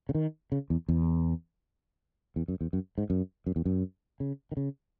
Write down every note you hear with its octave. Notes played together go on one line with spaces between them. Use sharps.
C#3
D#3
C#3
E2
E2
E2
F#2
E2
F#2
G#2
F#2
F#2
E2
F#2
C#3
D#3
C#3